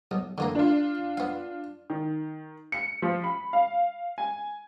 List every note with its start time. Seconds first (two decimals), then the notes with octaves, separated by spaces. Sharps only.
0.11 B1
0.38 D3 E3 A#3
0.55 D4 F4
1.17 B3 F5
1.90 D#3
2.72 C#7
3.02 F3
3.24 B5
3.53 F5
4.18 G#5